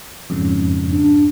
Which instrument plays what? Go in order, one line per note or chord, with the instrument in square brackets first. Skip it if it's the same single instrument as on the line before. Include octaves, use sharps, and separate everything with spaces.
[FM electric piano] F2 G#2 C#3
[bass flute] D4